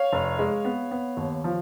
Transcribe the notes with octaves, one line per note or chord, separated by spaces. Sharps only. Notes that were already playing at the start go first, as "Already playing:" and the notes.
Already playing: C#5 F5
F1
G#3
B3
B3
D#2
F3